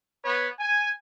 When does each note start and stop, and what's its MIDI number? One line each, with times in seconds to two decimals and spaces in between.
0.24 0.47 59
0.24 0.47 71
0.24 0.47 73
0.59 0.90 80